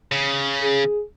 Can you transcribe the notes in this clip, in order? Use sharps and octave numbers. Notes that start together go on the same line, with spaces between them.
C#3
G#4